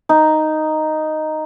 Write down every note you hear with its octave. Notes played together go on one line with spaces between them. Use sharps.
D#4